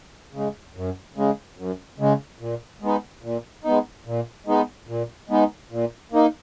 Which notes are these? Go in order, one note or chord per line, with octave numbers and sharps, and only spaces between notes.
C#3 G#3
F#2
C#3 G#3
F#2
C#3 G#3
A#2
G#3 B3 D#4
A#2
G#3 B3 D#4
A#2
G#3 B3 D#4
A#2
G#3 B3 D#4
A#2
A#3 D#4